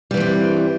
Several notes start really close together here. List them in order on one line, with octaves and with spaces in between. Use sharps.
G3 E3 G2 C4